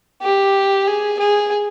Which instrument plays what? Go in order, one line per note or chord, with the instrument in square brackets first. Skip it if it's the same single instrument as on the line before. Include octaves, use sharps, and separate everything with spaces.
[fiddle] G4
G#4
G#4